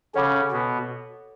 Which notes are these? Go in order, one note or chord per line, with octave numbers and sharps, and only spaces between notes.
C#3 C#4 A4 C#5 F#5 B5 D6
B2 B3